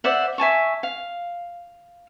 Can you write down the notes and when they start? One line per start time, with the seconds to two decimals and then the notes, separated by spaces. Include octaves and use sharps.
0.04 C5 D5 E5 F#5
0.38 E5 G#5 A5 C#6
0.83 F5